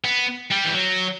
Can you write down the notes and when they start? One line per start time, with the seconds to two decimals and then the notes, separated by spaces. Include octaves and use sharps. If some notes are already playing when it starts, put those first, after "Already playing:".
0.05 B3
0.51 G3
0.64 E3
0.74 F#3